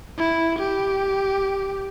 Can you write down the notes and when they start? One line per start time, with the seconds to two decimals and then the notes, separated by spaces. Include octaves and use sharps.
0.18 E4
0.59 G4